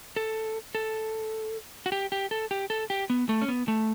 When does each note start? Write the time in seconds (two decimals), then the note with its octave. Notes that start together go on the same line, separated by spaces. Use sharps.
0.16 A4
0.75 A4
1.86 F#4
1.92 G4
2.12 G4
2.31 A4
2.51 G4
2.70 A4
2.90 G4
3.10 B3
3.29 A3
3.42 C#4
3.48 B3
3.68 A3